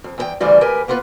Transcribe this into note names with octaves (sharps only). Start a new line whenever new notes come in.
F2
E2 A#4 G5
D2 G2 C#3 E3 G3 D5
D2 G4 A#4 B4 G#5
A#3 B3 F4 A4 B4